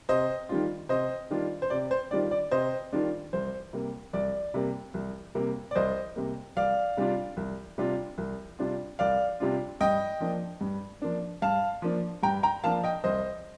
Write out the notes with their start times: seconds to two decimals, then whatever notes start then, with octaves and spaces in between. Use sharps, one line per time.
0.09 C3 C5 D#5
0.49 D#3 G3 D4 F4
0.89 C3 C5 D#5
1.31 D#3 G3 D4 F4
1.62 C5
1.70 C3 D5
1.91 C5
2.11 D#3 G3 D4 F4 D5
2.31 D5
2.51 C3 C5 D#5
2.92 D#3 G3 D4 F4
3.33 C2 C5
3.73 C3 G3 A#3
4.13 C2 D5
4.54 C3 G3 A#3
4.94 C2
5.35 C3 G3 A#3
5.71 D5
5.75 C2 C5 D#5
6.16 C3 G3 A#3
6.56 C2 D5 F5
6.97 C3 G3 D4 F4
7.37 C2
7.78 C3 G3 D4 F4
8.18 C2
8.59 C3 G3 D4 F4
8.99 C2 D5 F5
9.40 C3 G3 D4 F4
9.80 G2 D#5 G5
10.20 F3 A#3 D4
10.61 G2
11.02 F3 A#3 D4
11.42 G2 F5 A5
11.82 F3 A#3 D4
12.23 G2 G5 A#5
12.43 G5 A#5
12.64 F3 A#3 D4 F5 A5
12.84 D#5 G5
13.04 C2 C5 D#5